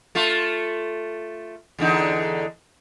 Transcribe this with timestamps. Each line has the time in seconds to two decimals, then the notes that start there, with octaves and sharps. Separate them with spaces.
0.15 A3 F4
1.79 E2 D3 D#4